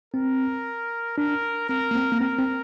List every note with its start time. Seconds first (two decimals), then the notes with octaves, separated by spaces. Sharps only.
0.14 C4 A#4
1.17 D4 A#4
1.69 C4 A#4
1.91 A#3
1.95 C4
2.12 A#3
2.20 C4 A#4
2.38 C4